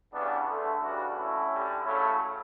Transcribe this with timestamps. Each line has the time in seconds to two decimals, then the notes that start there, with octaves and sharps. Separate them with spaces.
0.12 C#3 E3 G3 B3 D4
0.47 D3 A3
0.80 C#3 E3 G3 D4 F#4
1.15 D3 F#3 A3 C#4 E4
1.50 D3 G3
1.84 C#3 F#3 A3 C#4 E4